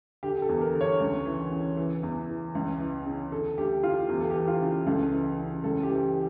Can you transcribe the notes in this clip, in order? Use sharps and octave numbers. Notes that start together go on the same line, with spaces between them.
D3 G4
A4
E2
A#4
D3
C#5
C#2
E3
C#3
E3
E2
E3
C#2
E3
C#3
D3 A4
D2 G4
D3 F4
E2 G4
A4
G4
E3
F4
C#3
C#2 A4
E3
C#3
C#2 A4
G4
E3